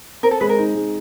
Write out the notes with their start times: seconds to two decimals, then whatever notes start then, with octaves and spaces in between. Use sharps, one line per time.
0.23 C4 A#4
0.31 A4
0.41 G#3 B4
0.49 A#4
0.58 D#4
0.75 G#3